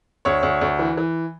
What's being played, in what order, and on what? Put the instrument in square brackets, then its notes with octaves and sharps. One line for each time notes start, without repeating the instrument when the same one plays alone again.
[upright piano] D2 C#5
D2
D2
E3
E3